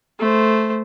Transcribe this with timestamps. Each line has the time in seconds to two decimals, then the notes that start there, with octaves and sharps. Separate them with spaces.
0.19 A3 C5